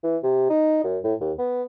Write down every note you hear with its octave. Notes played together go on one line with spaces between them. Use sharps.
E3
C3
D#4
F#2
A2
D#2
B3